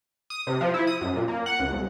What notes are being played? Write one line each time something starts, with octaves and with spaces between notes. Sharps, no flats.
D#6
C3
F3
E4
D#6
F#2
A#2
A#3
F#5
C#2
C2